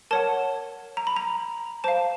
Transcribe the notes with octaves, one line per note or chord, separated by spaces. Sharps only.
A#4 C#5 F#5 A5
A#5
B5
A#5
C5 F5 A5